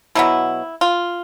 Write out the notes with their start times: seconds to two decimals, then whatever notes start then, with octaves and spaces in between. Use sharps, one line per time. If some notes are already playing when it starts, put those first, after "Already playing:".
0.15 B2 F#3 B3 E4
0.81 F4